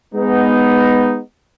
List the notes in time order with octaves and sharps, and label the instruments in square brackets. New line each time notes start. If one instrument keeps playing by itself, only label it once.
[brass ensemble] G#3 B3 D#4